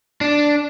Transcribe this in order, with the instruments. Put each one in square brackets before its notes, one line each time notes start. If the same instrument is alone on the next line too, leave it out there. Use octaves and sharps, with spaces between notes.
[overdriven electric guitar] D4